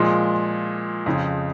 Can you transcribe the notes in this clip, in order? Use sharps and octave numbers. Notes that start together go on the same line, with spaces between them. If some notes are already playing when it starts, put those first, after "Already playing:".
Already playing: A#2 F3 G#3
F2 C#3 F3